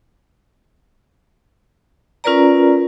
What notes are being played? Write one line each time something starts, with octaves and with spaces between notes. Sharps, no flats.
C#4 F4 A#4 B4 D5 A#5